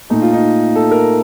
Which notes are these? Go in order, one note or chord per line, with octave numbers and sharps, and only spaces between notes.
A#2 A3 D#4
F4
D#4
A4
A#4